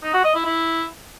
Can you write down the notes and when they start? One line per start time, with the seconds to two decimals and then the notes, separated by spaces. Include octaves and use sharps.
0.03 D#4
0.14 F#4
0.24 D#5
0.35 E4
0.45 E4